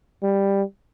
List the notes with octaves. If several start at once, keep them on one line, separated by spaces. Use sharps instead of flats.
G3